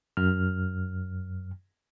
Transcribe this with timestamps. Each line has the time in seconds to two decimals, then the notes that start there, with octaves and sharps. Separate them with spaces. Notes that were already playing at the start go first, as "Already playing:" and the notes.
0.17 F#2 F6